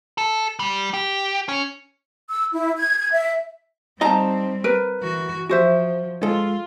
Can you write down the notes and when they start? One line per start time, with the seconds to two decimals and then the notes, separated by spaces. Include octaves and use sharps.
0.18 A4
0.59 G3
0.94 G4
1.48 C#4
2.29 E6
2.53 E4
2.77 G#6
2.98 G#6
3.11 E5
4.01 G3 C4 D#4 D#5 F5 A5 A#5
4.64 A#4 B4
5.01 E3 F#4
5.49 F3 F#4 C5 E5
6.23 G#3 F4 A4